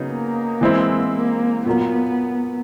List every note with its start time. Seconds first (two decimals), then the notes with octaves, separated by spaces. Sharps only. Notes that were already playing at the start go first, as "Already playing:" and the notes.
Already playing: C#3 F#3 B3 D#4
0.08 A#3
0.61 E3 G#3 C4 E4
1.13 A#3
1.66 A#2 F#3 A#3 B3